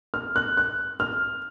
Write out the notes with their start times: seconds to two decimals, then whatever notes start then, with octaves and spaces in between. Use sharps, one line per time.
0.14 F6
0.36 F#6
0.57 F#6
1.00 F6